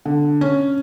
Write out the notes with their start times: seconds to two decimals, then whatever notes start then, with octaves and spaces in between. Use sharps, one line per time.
0.06 D3
0.41 C#4